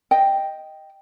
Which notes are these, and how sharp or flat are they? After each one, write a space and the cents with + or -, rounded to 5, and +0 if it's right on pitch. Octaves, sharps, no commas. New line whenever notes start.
D#5 +0 G5 +0